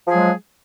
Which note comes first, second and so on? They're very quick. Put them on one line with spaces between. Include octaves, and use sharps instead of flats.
F3 G#4 G#3 F#3